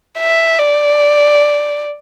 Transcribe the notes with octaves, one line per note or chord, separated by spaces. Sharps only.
E5
D5